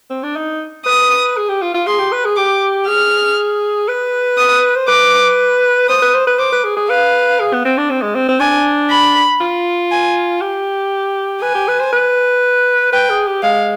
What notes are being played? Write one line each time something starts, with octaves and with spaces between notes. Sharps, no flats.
C4
D4
D#4
B4 D#6
G#4
G4
F4
F4
G#4 C6
G4
B4
G#4
G4 D6
G#4 F6
B4
D#6
C5
B4 D6
C5 D#6
B4
C5
B4
C5 D6
B4
G#4
G#4
B4 F5
G#4
B3
C4
D4
C4
G#3
C4
C4
D4 G#5
B5
F4
G#5
G4
B4 G#5
G4
B4
C5
B4
B4 G5
G#4
G4
G#3 F5